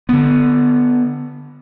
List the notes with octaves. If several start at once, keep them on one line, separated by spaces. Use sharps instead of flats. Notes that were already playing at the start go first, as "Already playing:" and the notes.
D3 B3